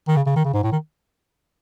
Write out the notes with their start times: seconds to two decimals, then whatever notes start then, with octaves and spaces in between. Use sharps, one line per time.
0.08 D#3
0.16 C#3
0.26 C#3
0.36 D#3
0.45 C#3
0.54 G#2
0.63 A2
0.72 D#3